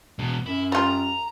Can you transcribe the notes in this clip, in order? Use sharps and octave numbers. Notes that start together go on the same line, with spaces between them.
E2 B2
F#2 E4
G3 F4 A#5